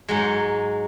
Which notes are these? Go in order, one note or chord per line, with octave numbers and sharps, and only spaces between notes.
G#2 F#3 G#3